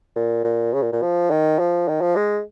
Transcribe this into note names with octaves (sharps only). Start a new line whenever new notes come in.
A#2
A#2
C#3
A#2
A#2
F3
D#3
F3
D#3
F3
G#3